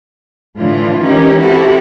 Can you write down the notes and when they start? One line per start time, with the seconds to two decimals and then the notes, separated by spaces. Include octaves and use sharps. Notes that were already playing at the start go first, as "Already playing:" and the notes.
0.58 A2 D3 E3 D4 F4
1.02 E3 G#3 C#4 D#4 G4 A#4
1.40 C4 E4 F#4 G4 A4